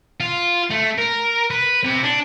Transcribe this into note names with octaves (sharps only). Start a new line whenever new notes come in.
F4
A3
A#4
B4
C3
D4